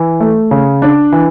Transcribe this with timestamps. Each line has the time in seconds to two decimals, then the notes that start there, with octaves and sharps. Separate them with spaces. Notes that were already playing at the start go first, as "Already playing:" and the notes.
Already playing: E3
0.20 A3
0.51 C#3
0.82 D4
1.12 E3